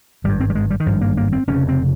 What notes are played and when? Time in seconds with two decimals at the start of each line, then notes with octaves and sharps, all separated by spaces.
0.24 G#1 G2 G3
0.40 C4
0.50 G3
0.55 G#3
0.70 G3
0.80 D#3
0.86 G#1 G2 F3
1.01 A#3
1.17 A#3
1.33 C4
1.47 F1 F2 C#3 C#4
1.69 C4